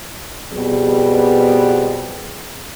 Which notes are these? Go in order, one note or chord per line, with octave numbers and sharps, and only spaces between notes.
F2 B2 G3 B3 G#4